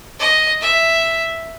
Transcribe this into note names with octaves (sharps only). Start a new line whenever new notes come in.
D#5
E5